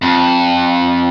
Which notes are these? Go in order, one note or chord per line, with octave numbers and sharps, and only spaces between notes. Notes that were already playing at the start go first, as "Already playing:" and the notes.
F2